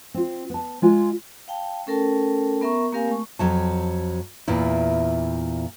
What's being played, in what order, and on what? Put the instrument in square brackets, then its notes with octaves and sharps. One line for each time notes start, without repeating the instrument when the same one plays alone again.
[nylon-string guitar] C4 F4
B3 A5
G#3 F4 G#5
[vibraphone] F5 G5 A5
A3 C#4 A4 A#4 G5 A5
B3 A#4 E5 A#5 C#6
A#3 C4 G4 A#4 F5 G#5
A3 C#6
[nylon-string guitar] F2 F#3 A5
E2 A#2 E4